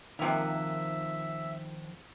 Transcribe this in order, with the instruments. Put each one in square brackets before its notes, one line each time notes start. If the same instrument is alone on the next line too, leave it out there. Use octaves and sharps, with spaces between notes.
[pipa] C3 A#3 [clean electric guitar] D#3 F3 F#5 [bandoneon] E5